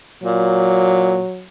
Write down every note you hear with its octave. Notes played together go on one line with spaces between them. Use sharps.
A#2 F#3